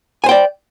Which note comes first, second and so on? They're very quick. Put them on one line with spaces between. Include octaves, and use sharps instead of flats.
G#5 C5 G5 D5